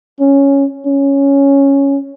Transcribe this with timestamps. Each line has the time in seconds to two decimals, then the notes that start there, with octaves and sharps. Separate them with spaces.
0.20 C#4
0.87 C#4